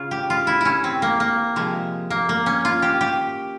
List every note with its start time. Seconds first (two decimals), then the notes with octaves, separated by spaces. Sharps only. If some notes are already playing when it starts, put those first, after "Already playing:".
Already playing: C#3 C#4 F4
0.11 G4
0.30 F4
0.47 E4
0.61 C#4 E4
0.84 C4
1.02 A#3
1.20 A#3
1.56 C3 F3 G#3
2.10 A#3
2.29 A#3
2.46 C#4
2.65 F4
2.82 G4
3.01 G4